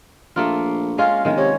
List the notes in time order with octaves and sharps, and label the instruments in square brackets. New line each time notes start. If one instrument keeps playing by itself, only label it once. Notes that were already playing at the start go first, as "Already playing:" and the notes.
[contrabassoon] A#1 [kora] A3 A#3 F4
[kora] G#3 C#4 F4 [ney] F5
[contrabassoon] D1 [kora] D#3 G#3
[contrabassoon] C3 [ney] C#5